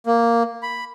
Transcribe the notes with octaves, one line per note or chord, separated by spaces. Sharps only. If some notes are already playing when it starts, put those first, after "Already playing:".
A#3
B5